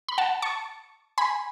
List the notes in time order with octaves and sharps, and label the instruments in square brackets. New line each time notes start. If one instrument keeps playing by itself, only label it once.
[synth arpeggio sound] B5
F#5 A5
A5 C#6
G#5 B5